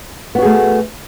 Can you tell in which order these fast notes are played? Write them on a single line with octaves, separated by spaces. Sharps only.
B3 F#4 G#4 A3